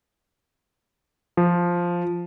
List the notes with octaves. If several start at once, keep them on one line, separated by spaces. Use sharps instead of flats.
F3